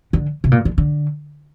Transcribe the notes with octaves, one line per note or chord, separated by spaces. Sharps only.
D3
C3
A#2
D3
D3